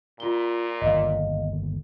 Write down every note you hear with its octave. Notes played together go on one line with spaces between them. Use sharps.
A#2 F4 G7
G1 D#2 D#5 F5